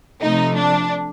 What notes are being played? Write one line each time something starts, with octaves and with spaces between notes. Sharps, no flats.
C3 F3 A3 D#4
D4